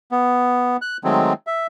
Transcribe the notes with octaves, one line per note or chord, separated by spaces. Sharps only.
B3
F#6
D#3 F#3 G#3 A3 C4
E5